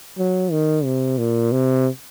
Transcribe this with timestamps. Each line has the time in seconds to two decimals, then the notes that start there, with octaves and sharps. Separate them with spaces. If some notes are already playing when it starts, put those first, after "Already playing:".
0.18 F#3
0.52 D#3
0.85 C3
1.19 A#2
1.52 C3